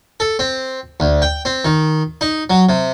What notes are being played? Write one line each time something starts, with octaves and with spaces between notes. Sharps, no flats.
A4
C4
D2
G5
C4
D#3
D#4
F#3
C3